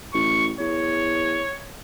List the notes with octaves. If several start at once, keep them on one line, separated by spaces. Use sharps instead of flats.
A1 C#6
E2 C#5